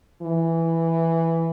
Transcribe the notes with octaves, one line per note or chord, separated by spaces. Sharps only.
E3